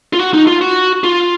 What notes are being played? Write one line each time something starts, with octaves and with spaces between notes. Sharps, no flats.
F4
F#4
D#4
F4
F#4
F4